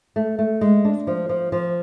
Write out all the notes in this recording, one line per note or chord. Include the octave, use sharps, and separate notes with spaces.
A3
A3
G#3
D4
F3
F3
F3